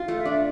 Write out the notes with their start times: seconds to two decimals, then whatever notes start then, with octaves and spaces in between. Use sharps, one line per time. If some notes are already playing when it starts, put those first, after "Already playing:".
Already playing: F4
0.08 A3
0.17 E5
0.25 D4